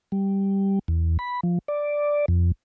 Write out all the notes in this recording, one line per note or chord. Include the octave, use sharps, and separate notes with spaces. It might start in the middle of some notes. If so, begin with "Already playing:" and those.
G3
E2
B5
F3
D5
F2